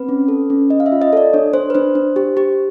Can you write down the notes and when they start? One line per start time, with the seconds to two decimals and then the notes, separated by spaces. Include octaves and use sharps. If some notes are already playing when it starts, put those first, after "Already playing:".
Already playing: C4 B4
0.09 C#4
0.28 A4
0.50 C#4
0.70 C#4 D#5
0.80 F5
0.86 E5
0.92 F4
1.02 D#5
1.13 A4 D5
1.34 D4 C#5
1.53 D4 C5
1.70 B4
1.75 D4 C5
1.95 D4
2.16 G4
2.37 G4